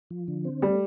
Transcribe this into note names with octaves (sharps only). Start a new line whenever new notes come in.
F3
D3
C4
G3 A3